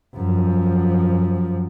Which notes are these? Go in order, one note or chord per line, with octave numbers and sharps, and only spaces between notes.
F#2 F3